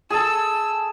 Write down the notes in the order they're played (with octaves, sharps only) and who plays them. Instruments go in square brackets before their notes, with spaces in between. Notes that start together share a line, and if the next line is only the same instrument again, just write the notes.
[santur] G#4 A4 [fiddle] E6